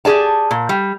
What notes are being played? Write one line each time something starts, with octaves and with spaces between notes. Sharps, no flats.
G4 G#4 D5 A5
A#2
G3